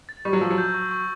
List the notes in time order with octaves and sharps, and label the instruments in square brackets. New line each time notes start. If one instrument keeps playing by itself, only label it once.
[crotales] A6
[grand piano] G3 [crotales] C#6
[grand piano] F#3
[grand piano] F3 [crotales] E6
[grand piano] F#3
[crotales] G6
C#6
C#6